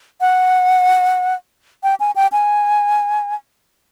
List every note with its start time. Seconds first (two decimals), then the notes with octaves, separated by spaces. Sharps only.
0.21 F#5
1.83 G5
2.00 G#5
2.16 G5
2.32 G#5